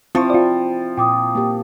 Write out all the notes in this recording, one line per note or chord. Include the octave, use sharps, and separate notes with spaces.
F3 C4 E4 F4 A5 C#6
F4 D5
A#2 G5 D6 D#6
A#3 G4